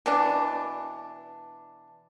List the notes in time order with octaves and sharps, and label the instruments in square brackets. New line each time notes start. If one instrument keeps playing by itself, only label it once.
[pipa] B2 E3 D4